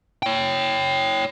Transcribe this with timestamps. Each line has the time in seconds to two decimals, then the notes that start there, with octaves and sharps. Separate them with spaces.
0.23 C#5 G5